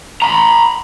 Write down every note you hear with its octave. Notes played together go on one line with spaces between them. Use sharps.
A#5 B5